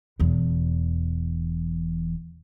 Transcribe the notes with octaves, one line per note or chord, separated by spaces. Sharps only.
E1 E2